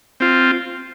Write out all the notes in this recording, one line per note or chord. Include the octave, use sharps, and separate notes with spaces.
C4 F4